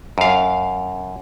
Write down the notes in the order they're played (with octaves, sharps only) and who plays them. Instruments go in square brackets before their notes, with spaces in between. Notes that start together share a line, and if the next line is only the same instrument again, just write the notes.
[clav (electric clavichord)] F#2 F5